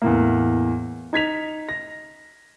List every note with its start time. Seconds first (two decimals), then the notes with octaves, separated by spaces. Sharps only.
0.02 E2 A2 A#3
1.13 D#4 G#6 B6 F7
1.69 A#6